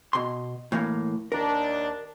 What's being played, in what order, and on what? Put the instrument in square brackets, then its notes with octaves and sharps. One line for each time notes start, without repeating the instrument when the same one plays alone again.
[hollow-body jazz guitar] B2 C6
A2 E3 A#3
[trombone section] D#2 D4 [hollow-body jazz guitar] A#4